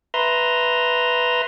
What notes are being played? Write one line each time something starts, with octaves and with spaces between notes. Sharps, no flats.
B4 E5 A#5 C6